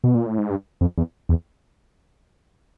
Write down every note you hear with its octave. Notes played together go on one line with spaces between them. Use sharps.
B2
A#2
A2
G#2
G2
F2
E2
E2